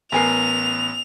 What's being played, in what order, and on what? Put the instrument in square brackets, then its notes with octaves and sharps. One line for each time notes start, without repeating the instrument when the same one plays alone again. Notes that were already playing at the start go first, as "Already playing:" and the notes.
[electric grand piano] A1 B3 C7 [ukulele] A#4 G#5 A#5 [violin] F7